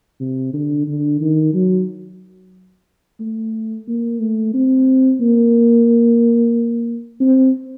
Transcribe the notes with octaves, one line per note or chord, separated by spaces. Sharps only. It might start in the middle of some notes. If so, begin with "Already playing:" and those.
C3
D3
D3
D#3
F#3
A3
A#3
A3
C4
A#3
C4